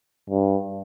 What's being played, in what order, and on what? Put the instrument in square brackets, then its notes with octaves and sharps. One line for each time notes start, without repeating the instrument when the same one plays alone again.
[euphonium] G2